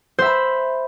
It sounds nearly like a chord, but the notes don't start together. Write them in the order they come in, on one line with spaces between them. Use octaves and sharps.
C5 E5 B5